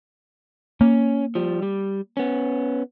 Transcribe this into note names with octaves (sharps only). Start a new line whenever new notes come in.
A#3 C#4
F3 G3
G3
B3 C#4